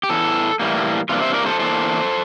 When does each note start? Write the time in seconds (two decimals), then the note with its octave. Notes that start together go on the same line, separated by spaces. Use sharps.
0.03 G4
0.09 E2 E3 A4
0.60 A2 E3 G3 A#3
1.09 C3 E3 G3 A#3 D4 F4
1.22 C5 E5
1.34 A#4 D5
1.46 A4 C5
1.59 E2 E3 A#3 D4 A4 C5